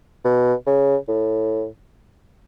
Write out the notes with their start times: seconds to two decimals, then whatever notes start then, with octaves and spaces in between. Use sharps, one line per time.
0.25 B2
0.67 C#3
1.08 A2